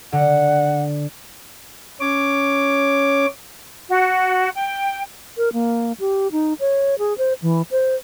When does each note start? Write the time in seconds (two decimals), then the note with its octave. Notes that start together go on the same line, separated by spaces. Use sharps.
0.13 D3 F#5
2.00 C#4 C#5 D6
3.90 F#4
4.55 G5
5.37 A#4
5.53 A#3
6.00 G4
6.32 D#4
6.60 C#5
6.98 G#4
7.18 C5
7.42 E3
7.71 C5